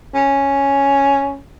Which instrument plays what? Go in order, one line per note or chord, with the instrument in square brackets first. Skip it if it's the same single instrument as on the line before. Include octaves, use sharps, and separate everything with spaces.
[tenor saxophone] C#4